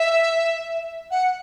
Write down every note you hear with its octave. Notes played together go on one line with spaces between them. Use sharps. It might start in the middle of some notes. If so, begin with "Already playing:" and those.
Already playing: E5
F#5